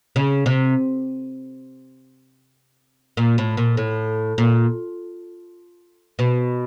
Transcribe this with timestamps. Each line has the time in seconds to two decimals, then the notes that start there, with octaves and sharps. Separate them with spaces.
0.16 C#3
0.46 C3
3.17 A#2
3.38 A2
3.57 A#2
3.77 A2
4.38 A#2
6.19 B2